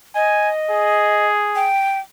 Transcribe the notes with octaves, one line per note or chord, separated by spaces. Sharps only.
D#5 G#5
G#4
G5